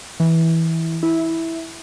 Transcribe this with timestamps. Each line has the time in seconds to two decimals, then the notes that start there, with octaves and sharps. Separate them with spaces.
0.20 E3
1.03 E4